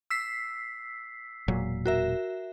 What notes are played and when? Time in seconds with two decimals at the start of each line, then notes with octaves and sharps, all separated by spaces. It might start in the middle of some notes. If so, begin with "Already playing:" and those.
0.10 E6 B6 C7
1.48 E1 A#2 F#3
1.86 F#4 A#4 E5